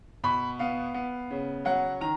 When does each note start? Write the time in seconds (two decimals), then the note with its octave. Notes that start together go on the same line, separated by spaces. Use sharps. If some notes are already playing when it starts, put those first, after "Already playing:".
0.24 B2 B5
0.59 B3 F5
0.94 B3
1.31 C#3
1.65 F#3 F#5
2.01 D#3 A#5